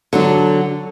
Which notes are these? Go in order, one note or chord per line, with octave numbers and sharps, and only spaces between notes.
D3 F#3 D4